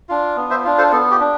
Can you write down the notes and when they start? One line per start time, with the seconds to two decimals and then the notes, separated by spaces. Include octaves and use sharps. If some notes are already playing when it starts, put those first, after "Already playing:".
0.09 D4 F4
0.36 B3
0.50 C5 E5
0.64 D4 F4
0.78 A4 C5
0.92 B3 A4
1.11 G4
1.21 D4